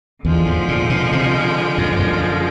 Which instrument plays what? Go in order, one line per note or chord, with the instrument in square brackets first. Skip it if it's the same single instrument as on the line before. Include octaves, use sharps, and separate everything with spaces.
[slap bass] E2 [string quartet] D3 F3 G#3
[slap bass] G#2
A#2
B2
C3
F#2
F#2